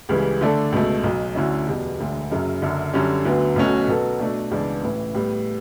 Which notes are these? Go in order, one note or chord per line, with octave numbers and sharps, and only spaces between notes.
C#2 C#3 E3 G3
D3 A3 D4 A4
C#2 B2 A3
B1 B2 F#3
D2 D3 F#3 C#4 E4
E2 B2 G3
E1 D2 D3
F#1 F#2 C#3 F#3
F#1 F#2 D3
F#2 D3 G3 C#4
D2 D3 F#3 B3
B1 B2 A3 C#4 F#4
B2 F#3 B3 F#4 A4
B2 A3 D4 F#4
C#2 C#3 E3 B3 D4
A1 A2 E3
A2 G3 B3